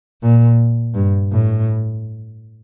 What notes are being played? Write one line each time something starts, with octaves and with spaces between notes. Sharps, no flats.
A#2
G2
A2